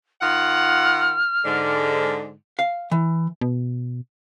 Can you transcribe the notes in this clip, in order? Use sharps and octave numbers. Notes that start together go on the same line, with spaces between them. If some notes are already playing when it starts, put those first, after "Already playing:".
D#3 F4 F#5 F6
G#2 D3
F5
E3
B2